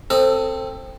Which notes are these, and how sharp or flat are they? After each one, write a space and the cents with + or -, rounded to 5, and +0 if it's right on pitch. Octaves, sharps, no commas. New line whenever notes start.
C4 +10 A4 +25 D#5 +0